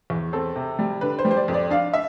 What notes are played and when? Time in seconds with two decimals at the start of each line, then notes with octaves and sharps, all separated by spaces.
0.10 E2
0.33 C4 A4
0.56 C3
0.79 G3
1.01 D3 B4
1.19 C5
1.25 G3
1.31 C5
1.37 D5
1.48 F2
1.54 D5
1.71 D4 F5
1.93 E5